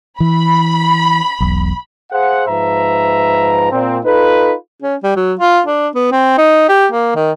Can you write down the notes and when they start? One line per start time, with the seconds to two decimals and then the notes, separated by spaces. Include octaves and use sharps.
0.20 E3 B5
1.40 E1 B1
2.11 G#4 C5 F5 F#5
2.48 G#2 F3 B4 E5 A#5
3.72 A#2 C4
4.04 D#4 F4 A4 B4
4.82 C#4
5.03 G3
5.16 F#3
5.39 F4
5.67 D4
5.95 B3
6.12 C4
6.38 D#4
6.69 G4
6.92 A#3
7.15 D#3